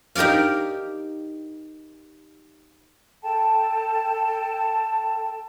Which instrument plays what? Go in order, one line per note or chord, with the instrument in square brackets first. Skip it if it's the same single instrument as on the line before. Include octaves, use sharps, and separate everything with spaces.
[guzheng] D#4 G4 A#4 D5 F5
[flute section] A4 G5 A5